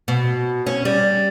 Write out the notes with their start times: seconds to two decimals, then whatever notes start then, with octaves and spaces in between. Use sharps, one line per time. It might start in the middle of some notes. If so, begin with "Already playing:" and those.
0.08 B2
0.67 C#4
0.85 G3